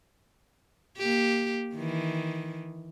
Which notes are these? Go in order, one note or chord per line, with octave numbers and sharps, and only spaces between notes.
A#3 G4
D#3 E3